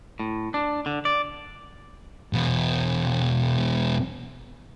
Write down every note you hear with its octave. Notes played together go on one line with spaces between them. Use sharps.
A2
D4
D3
D5
E2 B2